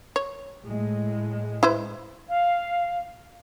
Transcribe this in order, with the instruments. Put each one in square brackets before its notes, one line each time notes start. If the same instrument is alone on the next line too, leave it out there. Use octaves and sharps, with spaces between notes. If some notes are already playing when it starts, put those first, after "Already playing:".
[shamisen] C#5
[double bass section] A2 G#3
[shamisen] E4 B4 C5
[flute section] F5